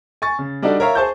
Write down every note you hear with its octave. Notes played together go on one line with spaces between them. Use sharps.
G#5 C#6 A6
C#3
G3 D4 D#4 F#4 A4 D5
A#4 C#5 E5 F5 A#5
G#4 C5 A5 C#6 G6